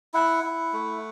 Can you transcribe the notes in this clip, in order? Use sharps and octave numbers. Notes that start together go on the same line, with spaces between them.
E4 F#5
E4
A3